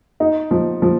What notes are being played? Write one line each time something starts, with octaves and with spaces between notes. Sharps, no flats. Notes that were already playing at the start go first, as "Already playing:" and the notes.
D#4
F3
F3